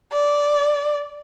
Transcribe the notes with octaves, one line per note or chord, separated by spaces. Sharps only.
D5